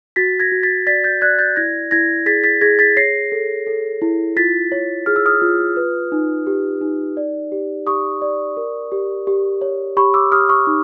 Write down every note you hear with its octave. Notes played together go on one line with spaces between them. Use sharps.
F#4 A6 B6
G#6 A#6
F#4
A6 B6
D5 A6 B6
G6 A6
D5 F#6 G#6
G6 A6
E4 G#6 A#6
E4 G#6 A#6
G#4 A6 B6
A6 B6
G#4 G#6 A#6
A6 B6
C#5 A#6 C7
A4
A4
E4
F4 A6 B6
C#5
G#4 F6
E6
D#6 F6
F4
B4
D#4
G4
D#4
D5
G4
G4 C#6 D#6
D5
A#4
G4
G4
C#5
G4 B5 C#6
D6 E6
G4 D#6 F6
C#6 D#6
D#4